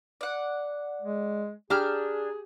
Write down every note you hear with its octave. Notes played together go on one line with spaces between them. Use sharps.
D5 F#5
G#3
D4 G4 G#4 A#5 F6